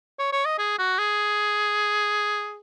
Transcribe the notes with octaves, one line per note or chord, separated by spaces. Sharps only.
C#5
C#5
D#5
G#4
F#4
G#4